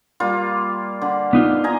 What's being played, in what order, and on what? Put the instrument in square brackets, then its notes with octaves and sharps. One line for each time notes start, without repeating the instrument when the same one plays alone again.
[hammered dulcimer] G3 A#3 F4
D3
[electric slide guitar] B3 D#4 F4
[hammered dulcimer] D#5 G#5 A#5